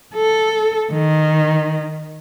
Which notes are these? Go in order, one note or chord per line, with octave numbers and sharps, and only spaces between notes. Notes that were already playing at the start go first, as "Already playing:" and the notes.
A4
D#3